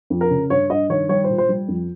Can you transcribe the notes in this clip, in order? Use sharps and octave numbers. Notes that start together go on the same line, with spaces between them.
F2
A#4
C#3
G2 C#5
G2 D#5
D#3 C#5
G3 C#5
A#2 C5
C5
G3
F2